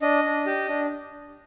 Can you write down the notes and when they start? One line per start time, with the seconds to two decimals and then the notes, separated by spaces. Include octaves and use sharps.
0.02 D4 D#5
0.24 D4
0.46 G4
0.69 D4